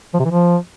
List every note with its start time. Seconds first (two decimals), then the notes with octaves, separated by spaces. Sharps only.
0.14 F3
0.20 C3
0.25 E3
0.31 F3